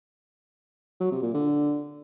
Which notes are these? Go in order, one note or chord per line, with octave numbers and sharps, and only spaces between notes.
F#3
C3
A#2
D3